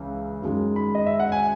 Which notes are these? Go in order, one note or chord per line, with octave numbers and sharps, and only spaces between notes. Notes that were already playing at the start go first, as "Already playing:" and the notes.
Already playing: C#2 C#3 E3
F#2 D#3 G#3
B5
D#5
E5
F#5
G#5